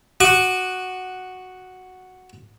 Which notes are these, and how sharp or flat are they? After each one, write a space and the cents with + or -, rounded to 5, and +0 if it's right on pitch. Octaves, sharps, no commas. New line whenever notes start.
F#4 +0 D6 +35